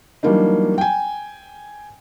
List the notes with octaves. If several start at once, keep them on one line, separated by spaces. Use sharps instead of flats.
E3 F#3 G3 A#3 D4 D#4
G5 G#5